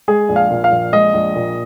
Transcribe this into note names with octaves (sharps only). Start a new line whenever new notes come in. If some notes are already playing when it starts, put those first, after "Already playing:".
G#3 G#4
A#1
F5
A#2
F5
A#1
G#3 D#5
A#1
A#2